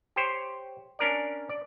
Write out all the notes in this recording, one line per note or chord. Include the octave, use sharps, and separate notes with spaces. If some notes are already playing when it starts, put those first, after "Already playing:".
G4 C5 C#5
C#4 D4 A#4 D5
D5